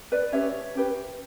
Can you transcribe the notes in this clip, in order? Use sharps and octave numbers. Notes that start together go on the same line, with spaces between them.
B4 D5
C#4 G4 B4 C#5 E5
C#4 G4 B4